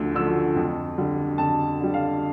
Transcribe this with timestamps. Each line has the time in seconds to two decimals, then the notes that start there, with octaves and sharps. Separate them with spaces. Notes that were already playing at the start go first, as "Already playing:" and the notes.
Already playing: D2 D3 F3 A3 E6
0.15 D3 F3 A3 E6
0.56 F2
0.98 D3 G3
1.38 F2 A5
1.80 D3 G3
1.94 F5